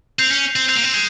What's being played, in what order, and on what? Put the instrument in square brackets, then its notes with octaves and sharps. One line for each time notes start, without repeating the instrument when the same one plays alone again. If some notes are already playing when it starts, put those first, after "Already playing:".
[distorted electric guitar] C4 [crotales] G6 C7 F7
[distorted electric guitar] C#4
C4
[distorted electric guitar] C4 [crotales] G6 C7 F7
[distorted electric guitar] A#3
C4
G#3